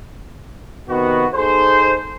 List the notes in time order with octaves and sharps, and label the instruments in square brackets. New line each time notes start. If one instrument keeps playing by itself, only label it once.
[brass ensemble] C3 D#3 B3 F#4
D#4 G#4 A4 C5